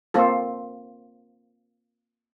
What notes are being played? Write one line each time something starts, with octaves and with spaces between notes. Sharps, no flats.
A#3 C4 F4 A4